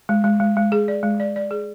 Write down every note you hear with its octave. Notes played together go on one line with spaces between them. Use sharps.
G#3
G#3
G#3
G#3
G#4
D5
G#3
D5
D5
G#4